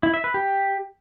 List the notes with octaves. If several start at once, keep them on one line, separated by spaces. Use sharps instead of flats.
E4
E5
B4
G4